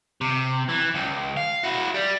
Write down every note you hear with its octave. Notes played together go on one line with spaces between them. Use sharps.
C3
E3
C#2
F5
E4 F#4
G3